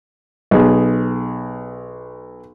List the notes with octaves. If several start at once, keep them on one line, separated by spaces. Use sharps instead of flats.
B1 G#4